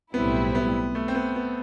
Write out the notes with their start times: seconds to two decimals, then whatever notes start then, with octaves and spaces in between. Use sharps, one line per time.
0.14 B1 A2 G3 B3 C4 E4
0.55 B3
0.95 A3
1.08 C4
1.15 B3
1.36 B3